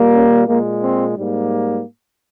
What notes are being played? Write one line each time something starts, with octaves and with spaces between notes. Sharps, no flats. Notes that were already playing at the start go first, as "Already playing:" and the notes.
Already playing: A#2 G3 A#3
C#4
A#2 G#3 A#3
C4
G#2 G3 A#3